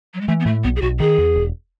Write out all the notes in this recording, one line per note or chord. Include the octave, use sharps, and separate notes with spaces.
F#3
G#3
E3 A3
B3
A2 A3
B1 B3
G#4
B1 F#4
D#3 G#4
E2
E1